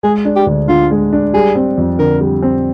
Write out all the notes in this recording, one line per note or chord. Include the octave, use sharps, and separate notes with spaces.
G#3 G#4
D4
G4
D2
D3 F4
G#3
D4
G3 G#4
C4
F2
D3 A#4
G3
C4